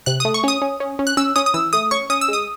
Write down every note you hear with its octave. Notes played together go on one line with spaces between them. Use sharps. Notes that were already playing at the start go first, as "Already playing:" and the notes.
C3 F#6
A3 D#6
C#6
C#4 D#6
C#4
C#4
C#4
F#6
C#4 E6
C#4 D#6
D#6
E3 E6
A3 D#6
C#4 C#6
C#4 D#6
E6
G#3 D#6